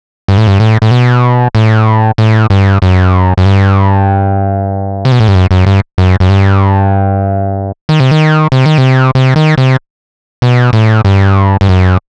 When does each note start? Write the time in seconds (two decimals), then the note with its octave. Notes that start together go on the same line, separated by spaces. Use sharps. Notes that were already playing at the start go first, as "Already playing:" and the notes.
0.28 G2
0.38 A2
0.47 G2
0.60 A2
0.82 A2
0.91 B2
1.55 A2
2.18 A2
2.50 G2
2.82 F#2
3.38 F#2
3.45 G2
5.05 C3
5.12 B2
5.20 A2
5.28 G2
5.35 F#2
5.51 F#2
5.66 G2
5.98 F#2
6.20 F#2
6.29 G2
7.89 D#3
8.00 C3
8.11 D#3
8.52 C3
8.66 D#3
8.78 C3
9.15 C3
9.36 D#3
9.58 C3
10.42 B2
10.73 A2
11.05 G2
11.61 G2
11.69 F#2